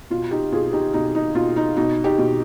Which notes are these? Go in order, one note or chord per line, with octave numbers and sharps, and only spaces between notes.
B2 F4
D#4 G4
B2 F4 G#4
D#4 G4
B2 D#4
D#4
B2 F4
D#4
B2 D#4
D#4 G4
B2